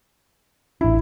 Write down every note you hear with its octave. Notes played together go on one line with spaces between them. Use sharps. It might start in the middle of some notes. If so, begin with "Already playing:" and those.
A1 D4 E4